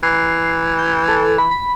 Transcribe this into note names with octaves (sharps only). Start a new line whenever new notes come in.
E3 C7
G6
A4
B5
B5